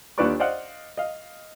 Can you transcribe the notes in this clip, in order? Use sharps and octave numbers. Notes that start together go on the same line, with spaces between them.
D#2 D4 F4 B4 D5 C#6
C5 D5 D#5 F5 F#5
D#5 F5